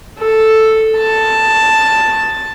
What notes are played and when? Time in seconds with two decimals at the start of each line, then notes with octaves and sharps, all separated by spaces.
0.19 A4
0.97 A5